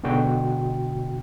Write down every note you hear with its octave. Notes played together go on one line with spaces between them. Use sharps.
G#2 B2 D3 F#4 G5